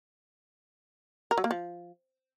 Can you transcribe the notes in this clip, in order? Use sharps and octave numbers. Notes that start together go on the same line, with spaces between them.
A#4
F#3
A#3
F3